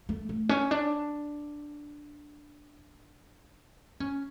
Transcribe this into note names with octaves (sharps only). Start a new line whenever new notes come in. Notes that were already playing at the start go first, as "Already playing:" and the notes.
A3
A3
C#4
D4
C#4